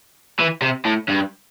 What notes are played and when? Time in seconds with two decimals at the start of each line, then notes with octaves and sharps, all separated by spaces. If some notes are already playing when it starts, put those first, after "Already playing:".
0.40 E3
0.62 C3
0.85 A2
1.08 G2